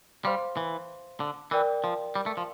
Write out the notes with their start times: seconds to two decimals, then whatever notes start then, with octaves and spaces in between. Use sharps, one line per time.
0.25 G3 C5 F5 C6
0.57 E3
1.20 D3
1.51 E3 A#4 D5 G5
1.84 F3
2.15 G3
2.26 A3
2.37 F3